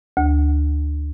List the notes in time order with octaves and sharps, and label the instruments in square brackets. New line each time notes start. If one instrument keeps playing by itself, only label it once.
[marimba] D2